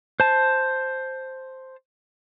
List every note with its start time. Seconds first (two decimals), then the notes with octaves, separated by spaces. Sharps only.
0.20 C5 A5